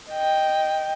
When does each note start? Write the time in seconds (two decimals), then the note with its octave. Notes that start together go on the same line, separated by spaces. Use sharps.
0.11 D#5 G5